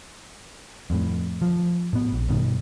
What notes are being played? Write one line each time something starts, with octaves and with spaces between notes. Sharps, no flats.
F2 A2
F3
A2 B3
A#1
G2 B2 D#3